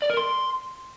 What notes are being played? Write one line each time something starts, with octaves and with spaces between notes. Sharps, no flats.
D5
A#4
C6